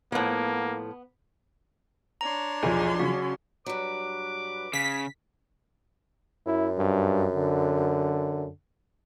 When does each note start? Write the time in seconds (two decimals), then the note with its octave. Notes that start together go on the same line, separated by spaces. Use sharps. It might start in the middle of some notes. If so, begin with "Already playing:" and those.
0.12 A2 F3 A#3 B3 F#5
2.21 D4 C#5 A#5 C6
2.63 B1 E2 F3 G#4
2.99 C#3 F#3 C#4 F#4
3.66 G2 F#3 B4 D6
4.73 C#3 B6
6.46 F#2 E4
6.78 G2
7.35 D3